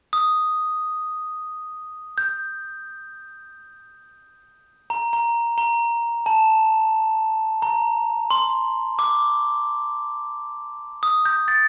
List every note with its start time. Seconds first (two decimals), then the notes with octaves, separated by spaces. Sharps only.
0.13 D#6
2.18 G6
4.90 A#5
5.13 A#5
5.58 A#5
6.26 A5
7.62 A#5
8.31 C6
8.99 D6
11.03 D#6
11.25 G6
11.48 A6